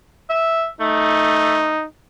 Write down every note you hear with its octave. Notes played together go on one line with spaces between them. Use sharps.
E5
A3 D#4